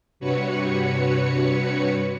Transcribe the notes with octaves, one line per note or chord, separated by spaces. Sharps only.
G2 C3 F#4 B4 C#5 C#7